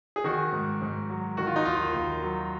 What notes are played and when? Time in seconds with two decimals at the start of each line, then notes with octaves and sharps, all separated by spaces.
0.16 G#4
0.24 D#3 F#4
0.52 G#2
0.82 G#2
1.10 F#3
1.37 D#3 F#4
1.47 F4
1.56 D#4
1.65 D#2 F4
1.94 D#2
2.23 F#3